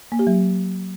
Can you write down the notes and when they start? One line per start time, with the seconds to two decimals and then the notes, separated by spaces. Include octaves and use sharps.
0.12 A#3
0.19 G4
0.27 F#3